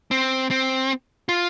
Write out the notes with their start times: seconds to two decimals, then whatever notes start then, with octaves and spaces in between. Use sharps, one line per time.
0.11 C4
0.51 C4
1.29 F4